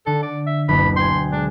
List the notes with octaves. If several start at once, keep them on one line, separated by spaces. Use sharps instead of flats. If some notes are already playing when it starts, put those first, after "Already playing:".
D3 A4
D5
E5
F#1 D2 B2 B5
G5 G#5 C6
G#3 D4